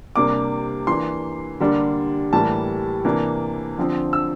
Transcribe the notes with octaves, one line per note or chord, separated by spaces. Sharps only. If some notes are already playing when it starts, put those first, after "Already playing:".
C3 G3 A#3 D4 D6
E3 A#3 D4 C6
D3 G3 A#3 D4
A2 E3 G3 A#3 A5
C3 E3 A#3 D4
D3 F3 C4
E6